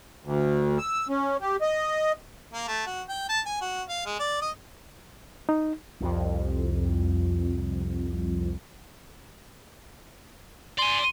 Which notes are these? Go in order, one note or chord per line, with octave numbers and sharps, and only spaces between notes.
D2
E6
C#4
G4
D#5
A#3
A3
F#4
G5
A5
G#5
F#4
F5
G#3
D5
D#5
D#4
C2 F2
D5 G#5 C6